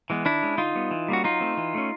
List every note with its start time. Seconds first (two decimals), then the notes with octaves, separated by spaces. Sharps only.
0.10 E3 G#3 B3
0.25 D#3 D4 E4
0.43 G#3 C#4
0.58 D3 D#4 F4
0.75 G3 B3
0.91 E3
1.08 G3 A#3 C#4 F#4
1.24 F#3 D#4 F4
1.41 A3 C4
1.57 E3
1.74 A3 C#4